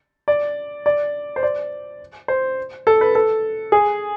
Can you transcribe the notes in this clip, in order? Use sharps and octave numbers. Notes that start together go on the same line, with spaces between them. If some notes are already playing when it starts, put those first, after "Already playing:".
D5
D5
C5
D5
C5
A4
B4
A4
G#4